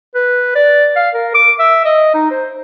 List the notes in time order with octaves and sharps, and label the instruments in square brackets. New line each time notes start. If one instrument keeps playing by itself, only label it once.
[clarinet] B4
D5
F5
A#4
D6
E5
D#5
D#4
C5